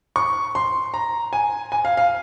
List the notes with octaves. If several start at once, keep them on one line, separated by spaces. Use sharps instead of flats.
C#6
C6
A#5
G#5
G#5
F5
F5